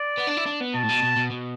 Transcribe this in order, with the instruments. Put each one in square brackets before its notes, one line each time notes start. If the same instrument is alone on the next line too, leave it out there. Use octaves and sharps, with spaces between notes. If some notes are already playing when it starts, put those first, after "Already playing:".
Already playing: [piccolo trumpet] D5
[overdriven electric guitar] B3
D4
E4
D4
B3
[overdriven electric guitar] B2 [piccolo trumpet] A5
[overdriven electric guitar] A2
B2
B2
B2
B2